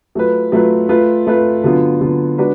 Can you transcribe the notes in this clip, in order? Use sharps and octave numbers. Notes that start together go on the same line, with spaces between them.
F#3 A3 F4 B4
F#3 A3 F4 B4
A3 F4 B4
A3 F4 B4
D3 F#3 B3 F4
D3 F#3 B3 F4
G#3 D4 F#4 B4